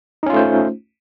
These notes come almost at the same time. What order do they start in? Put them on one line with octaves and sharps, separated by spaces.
D#4 C#4 F4 A3 C5